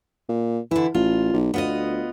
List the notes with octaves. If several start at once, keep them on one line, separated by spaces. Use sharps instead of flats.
A#2
D3 E3 E4
A1 F4
B1
D2 B3 F4 D#5